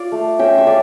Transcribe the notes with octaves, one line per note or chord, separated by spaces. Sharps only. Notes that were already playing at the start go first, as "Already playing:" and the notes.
Already playing: F4 D5 F5
A3
C#4 E5 G5
E5
C#4 D5 F5